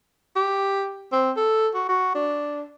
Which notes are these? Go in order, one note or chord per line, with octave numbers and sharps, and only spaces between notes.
G4
C4
A4
F#4
F#4
D4